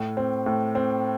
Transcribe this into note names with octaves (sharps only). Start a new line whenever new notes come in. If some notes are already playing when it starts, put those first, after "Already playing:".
Already playing: A2
C4
A2
C4